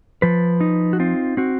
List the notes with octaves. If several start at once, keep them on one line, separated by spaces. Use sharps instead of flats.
F3 B4
D#4
F#4
C4 F4
C4 F#4